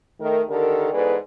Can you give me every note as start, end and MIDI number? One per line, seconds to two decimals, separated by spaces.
0.20 0.41 51
0.20 0.41 57
0.20 0.41 70
0.49 0.91 50
0.49 0.91 51
0.49 0.91 67
0.49 0.91 69
0.49 0.91 70
0.91 1.14 40
0.91 1.14 44
0.91 1.14 68
0.91 1.14 69
0.91 1.14 71
0.91 1.14 74